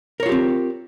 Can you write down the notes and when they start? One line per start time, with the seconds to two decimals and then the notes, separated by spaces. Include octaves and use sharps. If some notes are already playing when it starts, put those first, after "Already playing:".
0.20 A#4
0.23 C#5
0.26 F4
0.29 G4
0.32 C4